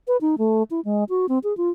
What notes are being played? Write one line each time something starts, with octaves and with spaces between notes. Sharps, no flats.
B4
D#4
A3
E4
G#3
F#4
C4
G#4
F4